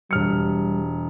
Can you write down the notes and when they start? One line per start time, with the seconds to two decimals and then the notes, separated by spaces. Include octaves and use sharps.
0.11 E1 G3 F6 C#7